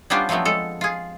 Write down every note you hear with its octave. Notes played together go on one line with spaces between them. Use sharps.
G3 B3 C#4 D4 F4 G4
F3 F#3 A3 B3 C4
G#3 A4
F4 G#4